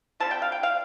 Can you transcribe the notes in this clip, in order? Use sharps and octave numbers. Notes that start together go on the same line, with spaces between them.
D3 G3 C4 F4 A5
G5
F5
G5
F5